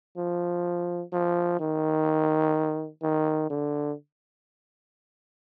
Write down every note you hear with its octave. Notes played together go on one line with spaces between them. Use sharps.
F3
F3
D#3
D#3
D3